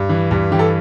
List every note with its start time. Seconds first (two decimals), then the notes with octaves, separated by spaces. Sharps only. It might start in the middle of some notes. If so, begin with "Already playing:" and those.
Already playing: G2
0.09 E3
0.31 G2
0.52 E3 G4
0.59 A4